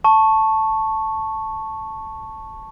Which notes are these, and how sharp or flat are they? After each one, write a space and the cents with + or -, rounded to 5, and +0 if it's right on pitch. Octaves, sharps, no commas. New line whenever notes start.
A5 +0 C#6 -5